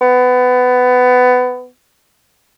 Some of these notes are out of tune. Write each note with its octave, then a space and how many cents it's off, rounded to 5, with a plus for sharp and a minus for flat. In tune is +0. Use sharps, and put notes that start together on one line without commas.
B3 +20